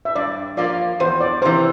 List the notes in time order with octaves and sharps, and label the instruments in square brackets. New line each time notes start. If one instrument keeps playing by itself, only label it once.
[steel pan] E5
[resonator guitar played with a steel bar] G2 [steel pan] D5
[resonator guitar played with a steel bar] F3 A#3 F4 [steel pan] D5
[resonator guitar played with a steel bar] E2 [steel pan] C5
[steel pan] D5
[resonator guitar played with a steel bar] C3 E3 [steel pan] C5